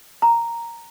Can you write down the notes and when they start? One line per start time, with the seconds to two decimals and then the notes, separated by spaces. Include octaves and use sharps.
0.22 A#5